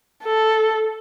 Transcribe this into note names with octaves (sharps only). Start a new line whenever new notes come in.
A4